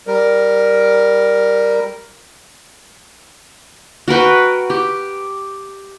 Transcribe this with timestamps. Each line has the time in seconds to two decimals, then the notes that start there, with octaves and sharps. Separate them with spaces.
0.07 G3 A#4
4.08 F#4 A#4 B4 G5
4.70 G4